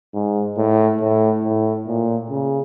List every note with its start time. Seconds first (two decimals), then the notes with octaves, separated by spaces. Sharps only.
0.14 G#2
0.57 A2
1.00 A2
1.44 A2
1.87 A#2
2.30 C#3